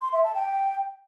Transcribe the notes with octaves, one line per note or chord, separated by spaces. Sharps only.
C6
E5
A5
G5